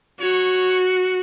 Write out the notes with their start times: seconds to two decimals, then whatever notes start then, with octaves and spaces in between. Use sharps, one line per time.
0.20 F#4 C#5